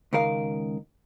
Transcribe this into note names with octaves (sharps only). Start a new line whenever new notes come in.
C#2 D#3 A#4 F5